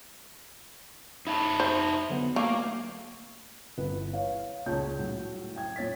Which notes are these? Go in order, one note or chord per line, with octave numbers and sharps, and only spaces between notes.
D#4 E5 A5 B5
C5
D3 F#3 B3
A3 A#3 F5 D6
G1 E3 B4
C#5 F5
C#2 A#2 C#5 A5 G6
A2 F#3
G5 G#6
A#2 C#5 A6 B6